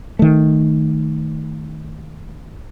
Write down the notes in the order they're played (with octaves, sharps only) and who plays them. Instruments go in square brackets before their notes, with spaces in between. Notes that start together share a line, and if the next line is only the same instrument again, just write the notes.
[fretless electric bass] D#3 A3